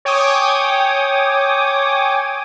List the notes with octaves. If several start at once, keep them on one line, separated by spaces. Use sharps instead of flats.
C#5 G5 G#5 D6 D#6